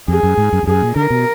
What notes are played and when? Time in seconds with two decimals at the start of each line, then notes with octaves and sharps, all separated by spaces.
0.08 F2 G#4
0.23 F#2
0.38 G#2
0.53 F#2
0.63 F2
0.67 F#2 G#4
0.82 A#2
0.96 D3 A#4
1.10 B2